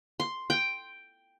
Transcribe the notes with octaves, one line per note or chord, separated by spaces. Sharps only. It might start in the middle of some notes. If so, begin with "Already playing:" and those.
C6
G5